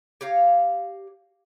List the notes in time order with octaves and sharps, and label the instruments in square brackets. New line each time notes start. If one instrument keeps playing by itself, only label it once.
[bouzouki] G4 C#5 F5 A#5